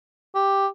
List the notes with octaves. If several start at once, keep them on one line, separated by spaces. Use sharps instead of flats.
G4